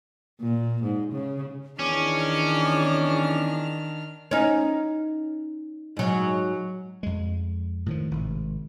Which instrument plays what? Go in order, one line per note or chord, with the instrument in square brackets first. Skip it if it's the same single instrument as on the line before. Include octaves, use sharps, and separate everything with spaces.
[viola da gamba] A#2
G#2
C#3
[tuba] E2 [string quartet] D#3 D4 F6 [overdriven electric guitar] C#4 [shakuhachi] D6
[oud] C#4 D#4
G#2 F#3
[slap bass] F2 G#3
A2 D#3 F3
G#1 C3